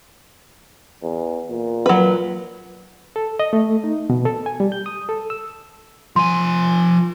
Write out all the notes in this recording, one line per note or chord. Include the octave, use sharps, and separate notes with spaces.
E2
A#2
F#3 B4
A4
D#5
A3
D#4
B2
A4
G#5
G3
G6
D#6
A4
E6
F3 G#5 C6